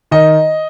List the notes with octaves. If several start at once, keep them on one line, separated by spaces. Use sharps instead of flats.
D#3 D#5